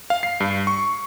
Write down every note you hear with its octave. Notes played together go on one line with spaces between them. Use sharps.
F5
C7
G2
C#6